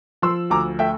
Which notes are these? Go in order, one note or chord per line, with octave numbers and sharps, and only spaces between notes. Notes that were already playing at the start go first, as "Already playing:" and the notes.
F3 C6 E6
D2 A#5 D6
A3 E5 G5